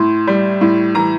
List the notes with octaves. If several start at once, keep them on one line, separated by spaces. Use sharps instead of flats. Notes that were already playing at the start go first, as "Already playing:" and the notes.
Already playing: A2 C6
G3
A2
E3 A#5